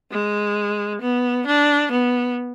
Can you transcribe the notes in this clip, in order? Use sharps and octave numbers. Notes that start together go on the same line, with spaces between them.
G#3
B3
D4
B3